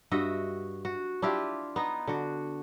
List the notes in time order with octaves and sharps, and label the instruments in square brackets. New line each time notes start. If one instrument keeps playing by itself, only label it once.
[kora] G2 F#4 D#5 E5
F#4
D4 E4 F4 G4
B3 D#4
D3 F#4